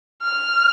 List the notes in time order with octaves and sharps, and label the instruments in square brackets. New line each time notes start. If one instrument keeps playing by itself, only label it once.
[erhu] F6